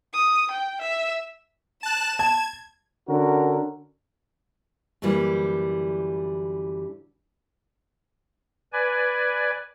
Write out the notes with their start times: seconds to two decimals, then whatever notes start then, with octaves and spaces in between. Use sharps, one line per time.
0.13 D#6
0.51 G5
0.81 E5
1.83 A5 F#6 E7
2.19 A5 G#6
3.08 D3 C#4 F#4 A#4
5.02 F#2 D3 E3 G3 A#3
8.73 B4 D5 G#5